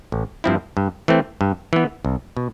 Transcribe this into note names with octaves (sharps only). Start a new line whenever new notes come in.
A1
G2 F3 C4 E4
G2
E3 A3 C4
G2
E3 B3
C2
B2